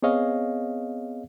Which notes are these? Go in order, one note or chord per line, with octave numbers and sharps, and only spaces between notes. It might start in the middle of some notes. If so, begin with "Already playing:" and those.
B3 C4 G#4 C#5 D#5 F5